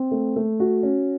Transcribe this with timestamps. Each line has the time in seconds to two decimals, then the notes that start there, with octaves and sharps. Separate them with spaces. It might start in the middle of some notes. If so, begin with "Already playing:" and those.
Already playing: C4
0.11 A3
0.36 A3
0.60 F#4
0.83 C#4